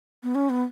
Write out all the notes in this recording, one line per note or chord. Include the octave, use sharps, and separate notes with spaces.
B3
C#4
B3